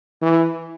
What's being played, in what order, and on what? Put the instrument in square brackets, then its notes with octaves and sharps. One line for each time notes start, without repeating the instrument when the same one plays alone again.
[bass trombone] E3